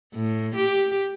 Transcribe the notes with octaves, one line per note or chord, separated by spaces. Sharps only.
A2
G4